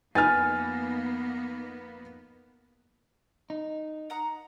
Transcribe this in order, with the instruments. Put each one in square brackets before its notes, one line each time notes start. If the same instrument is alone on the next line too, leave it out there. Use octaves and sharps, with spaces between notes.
[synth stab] F2 D#4 B4 [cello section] A#3 B3 [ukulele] G#5 [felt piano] F6 A6
[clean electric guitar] D#4
[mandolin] F#5 A#5 D#6